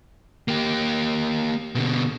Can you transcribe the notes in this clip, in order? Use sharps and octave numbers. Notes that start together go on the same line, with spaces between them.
A#3 G4
B2 D3